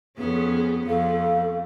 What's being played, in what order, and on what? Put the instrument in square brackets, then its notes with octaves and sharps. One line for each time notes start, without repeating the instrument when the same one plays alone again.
[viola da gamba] F2 B3 C#4 [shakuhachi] G#4
[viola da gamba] F2 [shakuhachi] A4 [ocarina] F5